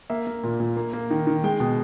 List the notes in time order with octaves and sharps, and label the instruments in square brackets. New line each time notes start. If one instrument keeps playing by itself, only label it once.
[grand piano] A#3 E5
A#3
A#2
A#2
A#3
A#3
D#3
D#3
G#3 G5
B2